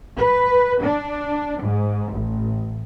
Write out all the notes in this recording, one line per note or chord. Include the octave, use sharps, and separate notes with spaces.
B4
D4
G#2
A1